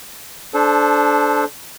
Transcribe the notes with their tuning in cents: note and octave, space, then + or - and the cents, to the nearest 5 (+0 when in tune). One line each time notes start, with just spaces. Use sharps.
D4 +0 A4 -25 C5 +0